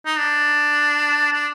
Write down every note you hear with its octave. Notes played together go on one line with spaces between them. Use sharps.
D#4
D4
D4